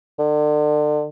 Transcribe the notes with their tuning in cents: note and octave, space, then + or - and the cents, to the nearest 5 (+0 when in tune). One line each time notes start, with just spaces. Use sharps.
D3 +35